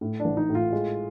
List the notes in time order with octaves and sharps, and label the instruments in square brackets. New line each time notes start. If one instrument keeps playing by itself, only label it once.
[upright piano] A2
[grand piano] D4
[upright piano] A1
[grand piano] D#4
[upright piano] A2
[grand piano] F4
[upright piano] G#3